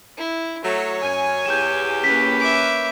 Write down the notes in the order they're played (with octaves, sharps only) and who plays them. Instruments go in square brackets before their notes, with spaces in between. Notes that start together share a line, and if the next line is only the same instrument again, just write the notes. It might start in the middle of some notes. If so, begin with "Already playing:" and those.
[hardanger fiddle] E4
[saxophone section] F#3 A3 [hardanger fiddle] C#5
[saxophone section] F#2 [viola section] G#5
[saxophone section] E2 G4 [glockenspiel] G6 E7
[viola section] A#3 C#4 B4 [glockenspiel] B6
[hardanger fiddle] E5 D6 [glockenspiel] G6